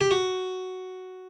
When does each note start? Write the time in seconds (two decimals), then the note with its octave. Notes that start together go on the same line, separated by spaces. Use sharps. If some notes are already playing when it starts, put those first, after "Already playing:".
0.01 G4
0.11 F#4